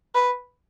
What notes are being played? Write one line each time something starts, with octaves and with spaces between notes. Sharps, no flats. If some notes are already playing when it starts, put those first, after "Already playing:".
B4